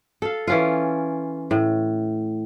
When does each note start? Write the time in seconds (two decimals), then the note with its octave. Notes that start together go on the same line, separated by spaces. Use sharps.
0.22 A4 F5
0.47 E3 C#4 F4
1.51 A2